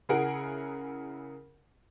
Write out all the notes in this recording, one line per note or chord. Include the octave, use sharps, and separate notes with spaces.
C#3 E4 G#4 A#4 F#5 D7